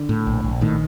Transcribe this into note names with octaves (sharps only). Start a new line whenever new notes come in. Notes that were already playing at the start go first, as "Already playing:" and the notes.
Already playing: D3
A2
A#1
A#1
A2 D#3